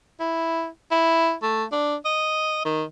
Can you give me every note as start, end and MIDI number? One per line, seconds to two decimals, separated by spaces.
0.20 0.67 64
0.91 1.34 64
1.43 1.64 57
1.72 1.96 62
2.05 2.62 75
2.65 2.84 51